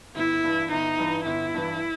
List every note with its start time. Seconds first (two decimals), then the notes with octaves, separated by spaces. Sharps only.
0.16 G1 E4
0.44 G2 E3
0.71 G1 D#4
0.98 G2 E3
1.26 G1 E4
1.54 G2 E3